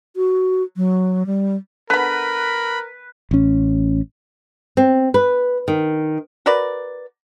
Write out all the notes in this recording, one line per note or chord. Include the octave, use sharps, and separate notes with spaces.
F#4
F#3
G3
D3 B3 A#4 B4 B5
A1 C#4
C4
B4
D#3
F#4 A#4 B4 D5